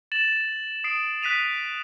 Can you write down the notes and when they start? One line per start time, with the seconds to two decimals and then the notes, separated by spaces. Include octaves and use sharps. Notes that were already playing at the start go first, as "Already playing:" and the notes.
0.12 A6 E7 F#7
0.84 D#6 C7 D7
1.22 F#6 B6 D#7 F7